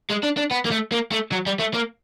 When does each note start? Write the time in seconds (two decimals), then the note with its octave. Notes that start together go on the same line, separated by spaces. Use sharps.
0.10 G#3
0.23 D4
0.37 D4
0.51 B3
0.65 A#3
0.71 A3
0.92 A#3
1.11 A3
1.32 F#3
1.46 G3
1.59 A3
1.74 A#3